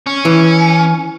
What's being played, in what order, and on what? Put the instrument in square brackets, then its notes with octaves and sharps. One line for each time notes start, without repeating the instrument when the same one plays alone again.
[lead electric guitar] C#4
[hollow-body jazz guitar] E3